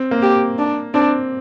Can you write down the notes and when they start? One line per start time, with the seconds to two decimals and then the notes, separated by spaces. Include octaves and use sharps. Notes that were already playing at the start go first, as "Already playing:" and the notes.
Already playing: C4
0.11 A#3
0.22 G4
0.58 D4
0.94 C4 D4